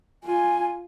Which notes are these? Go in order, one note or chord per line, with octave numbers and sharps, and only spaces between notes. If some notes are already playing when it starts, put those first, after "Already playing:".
F4 G#5